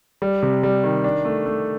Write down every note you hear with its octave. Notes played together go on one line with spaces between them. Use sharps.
G3
C3
G3
D#3
D4
A3
A3